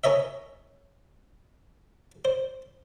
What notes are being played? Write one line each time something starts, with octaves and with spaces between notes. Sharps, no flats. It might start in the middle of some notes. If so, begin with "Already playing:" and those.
C#4 A#4 C#5 D#5 E5
C5